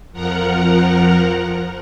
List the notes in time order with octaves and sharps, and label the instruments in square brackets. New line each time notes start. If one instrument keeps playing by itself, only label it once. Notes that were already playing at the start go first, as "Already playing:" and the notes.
[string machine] F2 F3 A#4 F#5 A#5